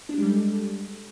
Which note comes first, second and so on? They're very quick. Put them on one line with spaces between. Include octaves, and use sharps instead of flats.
D4 G4 G#3 G3 A4